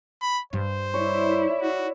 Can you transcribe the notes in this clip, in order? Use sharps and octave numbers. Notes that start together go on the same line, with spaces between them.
B5
G2 G3 C5
E4 C#5 D5
F#4